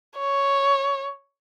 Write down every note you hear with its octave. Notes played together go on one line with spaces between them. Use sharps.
C#5